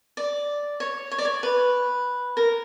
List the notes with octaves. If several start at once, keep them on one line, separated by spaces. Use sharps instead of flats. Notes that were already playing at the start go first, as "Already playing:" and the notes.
D5
C#5
C#5
D5
C#5
B4
A#4